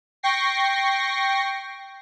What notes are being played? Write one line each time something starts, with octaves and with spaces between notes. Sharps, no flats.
G5 C#6 A#6 C7